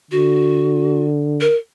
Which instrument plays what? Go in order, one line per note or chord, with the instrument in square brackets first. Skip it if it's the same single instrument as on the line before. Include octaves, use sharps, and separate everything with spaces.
[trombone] D3 [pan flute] F#4
[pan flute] A#4